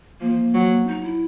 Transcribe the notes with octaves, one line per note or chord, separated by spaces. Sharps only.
F3 A#3
F#3
D#4
E4